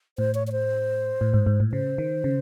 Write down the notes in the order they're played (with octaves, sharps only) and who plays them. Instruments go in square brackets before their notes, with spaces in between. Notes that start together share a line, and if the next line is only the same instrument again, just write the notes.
[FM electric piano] A2 [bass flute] C5
[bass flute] C#5
C#5
C5
[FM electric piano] A2
G#2
G#2
A2
[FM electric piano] C#3 [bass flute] C5
[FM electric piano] D#3
C#3